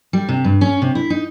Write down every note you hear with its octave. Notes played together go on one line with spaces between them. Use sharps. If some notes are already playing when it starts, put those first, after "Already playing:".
G3
C3
G2
C#4
C3
E4
D#4